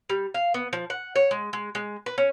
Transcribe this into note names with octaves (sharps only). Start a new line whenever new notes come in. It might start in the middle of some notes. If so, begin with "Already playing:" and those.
G3
F5
B3
F3
F#5
C#5
G#3
G#3
G#3
B4
C#4